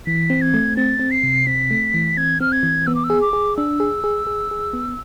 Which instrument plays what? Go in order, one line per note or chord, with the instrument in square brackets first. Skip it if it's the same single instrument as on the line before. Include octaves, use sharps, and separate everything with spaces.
[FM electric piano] E3 [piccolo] B6
[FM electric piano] C4
[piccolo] G#6
[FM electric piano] A3
[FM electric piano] C4 [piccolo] A6
[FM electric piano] C4
[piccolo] C7
[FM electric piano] C3
[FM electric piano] C4 [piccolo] B6
[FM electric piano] A3
E3
[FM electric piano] C4 [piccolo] G#6
[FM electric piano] C4 [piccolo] F6
[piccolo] G#6
[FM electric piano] E3
[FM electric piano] B3 [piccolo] E6
[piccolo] D6
E6
[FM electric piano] G#4
[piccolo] D6
[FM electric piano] G#4
[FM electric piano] D4 [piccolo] E6
[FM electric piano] G#4
G#4
G#4
G#4
B3